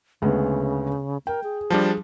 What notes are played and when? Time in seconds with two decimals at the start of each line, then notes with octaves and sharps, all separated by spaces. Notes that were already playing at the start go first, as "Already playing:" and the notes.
0.22 D2 C#3 G#3 B3
1.27 A#4 G5
1.44 G#4
1.70 F3 G3 D4 A5